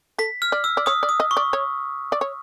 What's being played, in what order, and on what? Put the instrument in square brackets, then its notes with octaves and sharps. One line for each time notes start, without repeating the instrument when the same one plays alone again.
[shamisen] A4 [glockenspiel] B6
[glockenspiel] F6
[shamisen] D5
[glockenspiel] E6
[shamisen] D5
[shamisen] C#5 [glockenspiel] D#6
[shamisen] D5
[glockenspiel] D#6
[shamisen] D#5
[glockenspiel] C#6
[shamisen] D5
C#5
D5
C#5